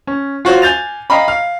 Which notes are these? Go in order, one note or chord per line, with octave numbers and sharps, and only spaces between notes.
C#4
F4 F#4 C5 C#5
G#5 G6 A6 F7
D#5 F5 G5 A#5 B5
F5